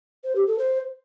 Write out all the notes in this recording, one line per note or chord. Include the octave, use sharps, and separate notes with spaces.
C5
G4
A4
C5